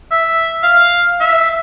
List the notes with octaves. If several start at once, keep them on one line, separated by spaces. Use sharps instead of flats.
E5
F5
E5